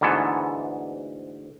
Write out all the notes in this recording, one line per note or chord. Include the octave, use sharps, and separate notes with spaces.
D2 G#2 E3 B3 A4